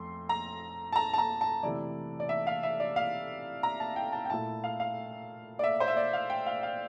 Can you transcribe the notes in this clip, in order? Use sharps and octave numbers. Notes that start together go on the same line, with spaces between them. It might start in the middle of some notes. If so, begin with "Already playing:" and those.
Already playing: F2 A3 C6
A#5
A5
A#5
A5
A#5
A5
C3 E3 A3 E4 D5
D5
E5
F5
E5
D5
F5
A#5
A5
G5
A5
G5
A#2 A3 E4 A5
F5
F5
D5
E5
C5
E5
D5
F5
G5
F5
F5